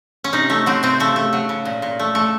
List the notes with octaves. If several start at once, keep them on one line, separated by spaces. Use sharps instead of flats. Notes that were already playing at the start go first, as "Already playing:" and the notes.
C#4
C3 D#4
A3 C#4
F#3 C4
C3 C4
C#3 A3
A3
F#3
C#3
A#2
A#2
A3
A3